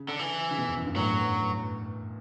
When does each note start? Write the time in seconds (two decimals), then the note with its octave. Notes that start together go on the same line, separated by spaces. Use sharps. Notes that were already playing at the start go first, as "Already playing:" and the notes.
Already playing: C#3
0.08 D3
0.19 E3
0.51 C#3
0.58 B2
0.67 E2
0.77 F#2
0.86 G2
0.96 A2 F#3